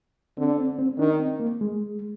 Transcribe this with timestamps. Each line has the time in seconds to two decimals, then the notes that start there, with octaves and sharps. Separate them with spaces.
0.37 D3 C4
0.58 C4
0.79 C4
0.99 D#3 D4
1.20 C4
1.40 A#3
1.61 G#3